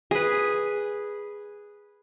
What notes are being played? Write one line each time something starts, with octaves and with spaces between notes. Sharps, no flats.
G#4 B4